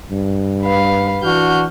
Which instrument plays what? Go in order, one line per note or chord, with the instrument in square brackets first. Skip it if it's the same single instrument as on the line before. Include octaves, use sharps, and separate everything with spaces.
[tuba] G2
[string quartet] B4 F5
[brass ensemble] E3 D4 F#4 [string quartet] F6 G6